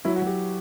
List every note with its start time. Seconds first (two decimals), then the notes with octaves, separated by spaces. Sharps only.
0.05 F#3 E4
0.16 F#4
0.22 F#3 G4